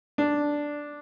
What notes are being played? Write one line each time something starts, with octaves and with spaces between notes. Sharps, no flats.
D4